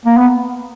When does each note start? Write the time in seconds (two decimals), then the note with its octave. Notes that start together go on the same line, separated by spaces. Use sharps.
0.05 A#3
0.17 B3